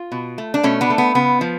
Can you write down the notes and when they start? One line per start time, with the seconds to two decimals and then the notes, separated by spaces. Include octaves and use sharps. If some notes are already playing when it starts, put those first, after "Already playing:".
Already playing: F4
0.12 B2
0.38 A3
0.54 D4
0.63 B2 A3 C#4
0.81 B3 D4
0.90 A3
0.98 B3
1.15 C#3 B3
1.41 F3